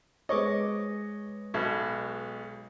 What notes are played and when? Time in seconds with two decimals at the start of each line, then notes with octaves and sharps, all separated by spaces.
0.29 G#3 B4 C#5 D#5 C#6 D6
1.54 B1 B2